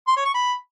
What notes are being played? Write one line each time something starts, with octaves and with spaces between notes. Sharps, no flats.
C6
C#5
C#6
B5